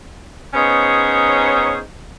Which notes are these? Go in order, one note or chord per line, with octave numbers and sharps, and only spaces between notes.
B3 C#4 D#4 G#4 C5 C#5